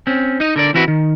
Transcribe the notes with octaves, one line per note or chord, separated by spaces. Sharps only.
C4 C#4
D#4 D#5
D3 A#4 D5
E3 C4 E4 F#4 B4
D#3